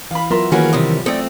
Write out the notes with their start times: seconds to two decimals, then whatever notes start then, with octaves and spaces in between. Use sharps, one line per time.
0.11 E3 F5 B5
0.30 F#3 B3 F4 A#4 E5 C6
0.52 D#3 E3 A#3 C#4 F#4 G#4 A#4 B4
0.73 F#2 C3 G3 D#6
1.06 A3 C4 A4 C#5 D5 D#6